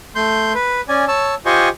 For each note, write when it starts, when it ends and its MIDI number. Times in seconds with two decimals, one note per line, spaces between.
0.15 0.53 57
0.15 0.53 84
0.15 0.53 91
0.55 0.81 71
0.89 1.05 61
0.89 1.05 74
0.89 1.05 80
1.08 1.35 73
1.08 1.35 81
1.08 1.35 88
1.46 1.69 65
1.46 1.69 67
1.46 1.69 72
1.46 1.69 75
1.46 1.69 80
1.46 1.69 85